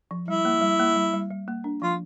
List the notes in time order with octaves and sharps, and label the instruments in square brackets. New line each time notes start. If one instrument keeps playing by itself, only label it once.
[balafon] F3
[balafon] G3 [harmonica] E4
[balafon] A#3
G3
A#3
G3
G3
G3
A#3
D4
[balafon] F3 [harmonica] F4